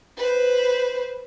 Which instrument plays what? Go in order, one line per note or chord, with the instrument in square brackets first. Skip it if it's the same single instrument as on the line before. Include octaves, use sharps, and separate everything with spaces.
[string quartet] B4 C5